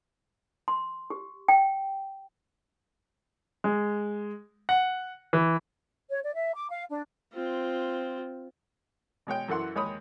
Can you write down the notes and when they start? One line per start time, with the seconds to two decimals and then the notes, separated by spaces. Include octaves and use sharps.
0.68 C6
1.10 G4
1.48 G5
3.64 G#3
4.69 F#5
5.33 E3
6.09 C#5
6.23 D5
6.34 E5
6.54 D6
6.69 F5
6.89 D4
7.33 C4 F4
9.27 B2 G#3 C#5 G5
9.48 F#2 E3 A4 F#5 C6
9.75 D#2 G#3 C#5 B5 D#6